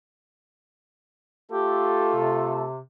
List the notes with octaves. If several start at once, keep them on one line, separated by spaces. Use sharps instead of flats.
A3 F4 G4 A4
C3